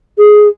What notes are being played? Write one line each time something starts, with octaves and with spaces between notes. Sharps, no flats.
G#4